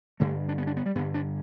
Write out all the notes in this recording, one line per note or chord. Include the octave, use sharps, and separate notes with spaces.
G2 D3 A3
D4
B3
D4
B3
G3
G2 D3 B3
D4